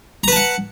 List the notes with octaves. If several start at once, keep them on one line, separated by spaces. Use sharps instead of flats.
B4 F#5 A5 A#5